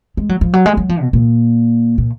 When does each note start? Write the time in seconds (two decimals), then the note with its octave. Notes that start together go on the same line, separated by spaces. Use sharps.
0.17 G#3
0.29 F#3
0.41 F3
0.54 F#3
0.66 G#3
0.77 F#3
0.89 F3
1.01 B2
1.13 A#2
1.98 A#2